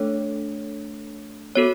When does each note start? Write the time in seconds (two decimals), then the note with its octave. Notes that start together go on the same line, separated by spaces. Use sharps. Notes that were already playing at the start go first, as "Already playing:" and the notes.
Already playing: A3 D4 A4 C#5
1.55 B3 F#4 A4 C#5